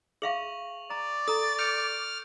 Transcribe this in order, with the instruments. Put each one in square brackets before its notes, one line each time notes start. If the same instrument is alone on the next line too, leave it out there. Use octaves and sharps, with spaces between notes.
[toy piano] G#4 E5 F5 [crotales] C#6 F7 F#7
[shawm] D5 [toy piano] A#5
[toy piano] A4 A#5 [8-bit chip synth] A6
[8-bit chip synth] F6 [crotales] G6 C#7 D7